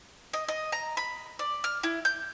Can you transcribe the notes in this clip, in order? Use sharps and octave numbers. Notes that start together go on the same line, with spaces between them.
D#5
D#5
A#5
B5
D5
F6
E4
G6